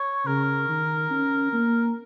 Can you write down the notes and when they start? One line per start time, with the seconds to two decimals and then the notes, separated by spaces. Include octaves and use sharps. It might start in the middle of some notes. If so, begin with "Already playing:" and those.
Already playing: C#5
0.26 C#3 A#4
0.68 D#3
1.10 C#4
1.53 A#3